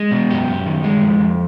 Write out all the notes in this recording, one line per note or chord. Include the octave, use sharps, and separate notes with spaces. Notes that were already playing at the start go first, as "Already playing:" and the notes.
Already playing: G#3
B2
F#2 G4
F#2
D#3
G#3
F2
F2